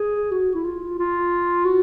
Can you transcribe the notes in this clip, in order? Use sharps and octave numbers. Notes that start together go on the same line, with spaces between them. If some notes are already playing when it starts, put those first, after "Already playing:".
Already playing: G#4
F#4
E4
F4
F4
F#4